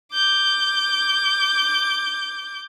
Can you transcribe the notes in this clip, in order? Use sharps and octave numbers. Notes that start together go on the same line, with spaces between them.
D6 G6